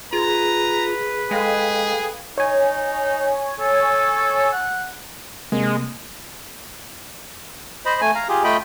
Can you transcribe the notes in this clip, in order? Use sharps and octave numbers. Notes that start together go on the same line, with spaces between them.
F4 G#4 B4 A#5
G#3 G#4 A4 F5 G5
D#4 C#5 G#5
A4
F#5
C3 G#3 A#3
C5 D#5 B5
A3 G#5
F5 A#5
F4 G4 G#4
A3 F4 D#5 G5 B5